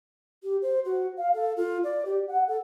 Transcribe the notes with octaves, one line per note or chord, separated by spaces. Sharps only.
G4
C5
F#4
F5
A4
F4
D5
G4
F#5
A4